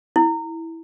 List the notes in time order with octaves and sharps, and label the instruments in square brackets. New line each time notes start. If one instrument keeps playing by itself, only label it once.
[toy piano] E4